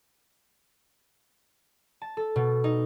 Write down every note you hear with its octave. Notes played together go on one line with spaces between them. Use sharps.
A5
A4
B2
D#4